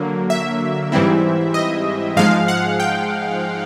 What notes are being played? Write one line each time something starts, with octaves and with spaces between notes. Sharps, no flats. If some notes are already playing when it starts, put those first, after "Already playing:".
Already playing: D3 F#3 A#3
E5
G#2 E3 G3 C4 E4
D#5
G#2 F3 G#3 F5
F#5
G5